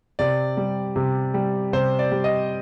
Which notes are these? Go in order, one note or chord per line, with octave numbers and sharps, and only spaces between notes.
C3 D5
G3
C3
G3
C3 C5
D5
G3
D#5